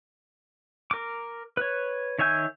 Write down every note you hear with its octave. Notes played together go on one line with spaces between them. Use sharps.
A#4 D6
B4 C#5
D#3 C#5 E5 G#5 G6